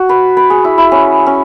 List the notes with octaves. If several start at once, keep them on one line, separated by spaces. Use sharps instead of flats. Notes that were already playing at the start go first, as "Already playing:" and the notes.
Already playing: F#4
B4
B4
G#4
E4
E4
C#4
C#4